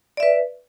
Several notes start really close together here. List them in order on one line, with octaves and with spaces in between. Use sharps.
D5 E5 B4